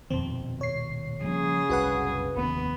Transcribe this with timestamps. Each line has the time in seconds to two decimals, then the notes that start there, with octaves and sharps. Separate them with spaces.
0.10 D#1 F2 B2 D#3 C4
0.61 C#5 C7
1.24 C#3 F3 G3 A#3 G#4
1.69 F#1 C2 F#2 F#4 B4 F#5
2.36 F1 D#2 B3